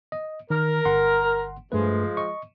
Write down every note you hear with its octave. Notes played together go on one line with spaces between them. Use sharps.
D#5
D#3 A#4
G1 F#5 C6
G2 F3 G#3 A3 B4
D#5 C#6